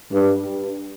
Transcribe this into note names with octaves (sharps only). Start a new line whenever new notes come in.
G2